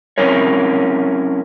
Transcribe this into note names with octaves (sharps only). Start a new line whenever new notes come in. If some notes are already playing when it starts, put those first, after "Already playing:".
F#3 C4 C#4 E4 A#4 C#5